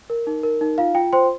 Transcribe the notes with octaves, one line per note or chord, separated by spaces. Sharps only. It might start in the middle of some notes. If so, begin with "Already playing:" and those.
A#4
D#4
A#4
D#4
F4 F5
F4 G5
C5 G5 C6